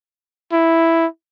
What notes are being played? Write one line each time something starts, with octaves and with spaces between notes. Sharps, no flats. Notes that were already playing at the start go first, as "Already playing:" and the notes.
E4